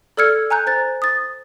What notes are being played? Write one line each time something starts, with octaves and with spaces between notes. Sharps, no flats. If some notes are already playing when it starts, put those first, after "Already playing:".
A4 D5 E6 F6 G#6 C#7
G#5 A#5 F#6 G6
C5 F#6 A6
D#6 A6